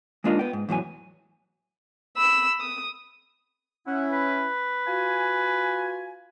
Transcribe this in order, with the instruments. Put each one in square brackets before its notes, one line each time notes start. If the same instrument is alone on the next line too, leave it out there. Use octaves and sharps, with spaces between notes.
[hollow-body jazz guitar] G#3 A#3 D4 D#4 F4 A#4
B3 G5
G#2
E2 A2 F#3 G#5
[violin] B5 E6
D#6
[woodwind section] C#4 E4 [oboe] F#5
[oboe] B4
[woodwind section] F4 F#4 G#5